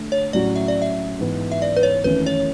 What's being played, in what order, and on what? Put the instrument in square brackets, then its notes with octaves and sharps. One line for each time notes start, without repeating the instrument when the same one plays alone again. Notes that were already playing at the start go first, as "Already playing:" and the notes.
Already playing: [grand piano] D3 A3
[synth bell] C#5
[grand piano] A2 F#3 C#4 F#4 [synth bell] D5
[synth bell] E5
D5
E5
[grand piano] G#2 E3 B3
[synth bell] E5
D5
B4
C#5
[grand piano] G#1 F#2 E3 A3 C#4 [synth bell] B4
[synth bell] C#5